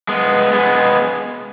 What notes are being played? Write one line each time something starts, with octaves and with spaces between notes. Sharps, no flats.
G#3 B3
G#3 B3